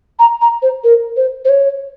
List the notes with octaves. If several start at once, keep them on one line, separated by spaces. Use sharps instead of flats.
A#5
A#5
C5
A#4
C5
C5
C#5